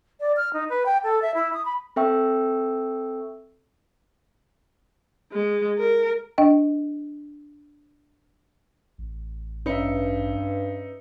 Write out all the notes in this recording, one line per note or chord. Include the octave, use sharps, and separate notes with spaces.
D5
F6
D#4
B4
G5
A4
E5
E4
D#6
B5
C4 A4 E5 G5 C#6 E6
G#3
A#4
D4 D#5 G5
A1
G2 C#4 D#4 B4 E5 C#7